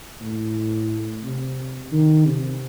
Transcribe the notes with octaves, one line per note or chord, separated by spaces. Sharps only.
A2
C3
D#3
C3